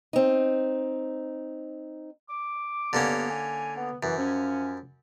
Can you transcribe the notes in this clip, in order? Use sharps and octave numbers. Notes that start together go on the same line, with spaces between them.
C4 D#4
D6
G2 D3 A#3 B3 C#4
G#5
B3
F#2 E3
F3 C#4